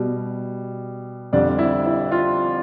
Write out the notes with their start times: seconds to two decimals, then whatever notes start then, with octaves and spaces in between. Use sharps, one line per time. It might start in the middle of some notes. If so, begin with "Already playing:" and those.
Already playing: B2 G3
1.33 F2 D3 G3 D4
1.58 E4
1.85 E4
2.12 F4